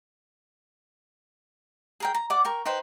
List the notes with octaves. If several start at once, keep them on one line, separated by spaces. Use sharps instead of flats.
G#4 A#4 G5
A#5
D5 F#5 D6
A#4 G5 C#6
D#4 B4 C5 G5